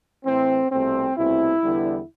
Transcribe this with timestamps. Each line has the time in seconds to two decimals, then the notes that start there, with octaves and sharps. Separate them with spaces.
0.25 A2 E3 A3 C4
0.71 C2 B2 A3 C4
1.17 C2 B2 A3 C4 E4
1.63 E2 D3 G3 B3